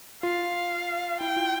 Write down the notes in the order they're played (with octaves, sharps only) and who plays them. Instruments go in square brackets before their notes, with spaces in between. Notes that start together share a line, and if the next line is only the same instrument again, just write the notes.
[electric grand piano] F4 [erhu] F5
[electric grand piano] E4 [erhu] G5
[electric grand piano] F4